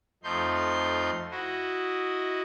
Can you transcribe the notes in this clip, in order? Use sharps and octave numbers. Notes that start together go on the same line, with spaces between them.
F2 F3 A3 D#4 C6 G6
E4 F#4 D#5